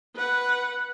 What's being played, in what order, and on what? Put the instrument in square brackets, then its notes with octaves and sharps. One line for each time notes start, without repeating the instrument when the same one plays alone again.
[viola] B4 F#5